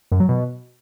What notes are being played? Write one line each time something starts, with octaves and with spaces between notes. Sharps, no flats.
F#2
F#3
B2